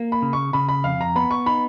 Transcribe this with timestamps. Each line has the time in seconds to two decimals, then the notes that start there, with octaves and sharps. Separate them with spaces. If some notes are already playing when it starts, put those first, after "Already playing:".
Already playing: A#3
0.12 B5
0.22 C#3
0.33 C#6
0.53 C#3 B5
0.68 B5
0.84 F2 F5
1.01 A#5
1.16 B3 B5
1.31 C#6
1.46 D#4 B5